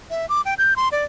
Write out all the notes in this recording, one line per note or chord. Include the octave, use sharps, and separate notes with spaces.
E5
D6
G5
G6
C6
D5